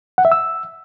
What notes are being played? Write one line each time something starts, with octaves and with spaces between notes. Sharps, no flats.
F#5
E5
E6